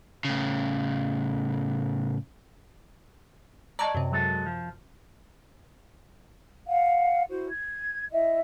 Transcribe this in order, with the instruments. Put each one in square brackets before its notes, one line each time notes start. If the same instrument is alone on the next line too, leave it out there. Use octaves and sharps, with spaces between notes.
[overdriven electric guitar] A2 C#3
[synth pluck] D5 C#6 G#6 [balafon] D#5 A5 A#5
[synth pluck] F#2 C3
[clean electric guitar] F#3 G#3 A4
F3
[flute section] F5 F#5
E4 F#4 C5
G#6
E4 D#5 E5